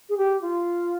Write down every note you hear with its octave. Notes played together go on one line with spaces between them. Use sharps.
G#4
G4
F4